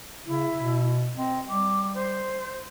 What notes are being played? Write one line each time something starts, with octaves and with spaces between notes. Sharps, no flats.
C#3 E4
B2
C4 D#5
G3 D6
C5